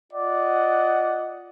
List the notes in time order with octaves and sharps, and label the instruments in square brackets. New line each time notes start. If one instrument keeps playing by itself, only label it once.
[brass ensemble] F4 D5 D#5 F#5